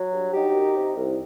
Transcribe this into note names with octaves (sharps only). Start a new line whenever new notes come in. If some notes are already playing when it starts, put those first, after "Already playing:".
Already playing: F#3
G2
F#3 D#4 G4
F#2
C3
C2